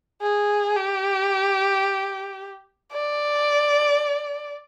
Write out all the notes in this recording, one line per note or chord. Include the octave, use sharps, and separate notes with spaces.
G#4
G4
D5